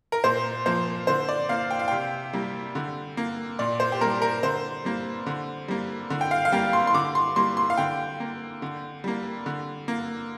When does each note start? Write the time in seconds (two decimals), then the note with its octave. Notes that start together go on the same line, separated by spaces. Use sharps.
0.12 A#4
0.24 A#2 C5
0.66 F3 A#3 C5
1.07 D3 C5
1.29 D5
1.49 A#3 F5
1.71 G5
1.79 F5
1.88 C3 G5
2.33 G3 A#3
2.75 D3
3.17 A#3
3.59 A#2 D5
3.80 C5
3.92 G4
4.01 G3 A#3 A#4
4.22 A#4
4.43 D3 C5
4.85 G3 A#3
5.26 D3
5.68 G3 A#3
6.10 D3
6.21 G5
6.31 F5
6.45 F5
6.52 G3 A#3 G5
6.73 C6
6.87 C6
6.94 D3 D6
7.15 C6
7.36 G3 A#3 C6
7.57 C6
7.70 F5
7.77 D3 G5
8.20 A#3
8.62 D3
9.04 G3 A#3
9.46 D3
9.88 A#3